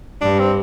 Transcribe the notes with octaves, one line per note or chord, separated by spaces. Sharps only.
G2 D4
C4